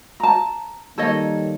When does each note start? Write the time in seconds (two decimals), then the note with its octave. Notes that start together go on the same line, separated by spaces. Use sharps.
0.20 A5 A#5
0.98 D#3 G3 A#3 A4 C#5 D#5